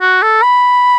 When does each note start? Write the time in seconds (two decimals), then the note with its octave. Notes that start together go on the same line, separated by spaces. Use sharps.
0.01 F#4
0.22 A4
0.42 B5